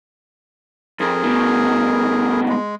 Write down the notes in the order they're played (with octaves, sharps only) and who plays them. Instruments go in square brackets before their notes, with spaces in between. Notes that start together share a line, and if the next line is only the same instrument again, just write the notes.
[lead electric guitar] F2 [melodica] G#4 A#4
[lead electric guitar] D2 B2
[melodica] G#3